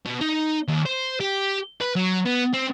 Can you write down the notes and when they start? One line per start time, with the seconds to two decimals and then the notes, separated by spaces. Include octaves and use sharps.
0.05 B2
0.21 D#4
0.68 D#2
0.86 C5
1.20 G4
1.81 B4
1.96 F#3
2.25 B3
2.53 C4